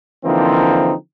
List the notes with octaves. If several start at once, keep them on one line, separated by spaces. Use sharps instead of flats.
D3 E3 F3 A#3 C4 D#4